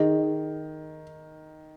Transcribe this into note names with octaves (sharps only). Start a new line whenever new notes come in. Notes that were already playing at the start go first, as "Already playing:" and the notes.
Already playing: D#3 G#4 D#5